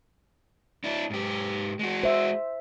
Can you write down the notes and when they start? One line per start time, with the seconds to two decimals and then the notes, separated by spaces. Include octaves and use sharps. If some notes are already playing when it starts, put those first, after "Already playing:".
0.84 D4 E4
1.10 G#2 G4
1.79 G#3 F#4
2.03 C5 E5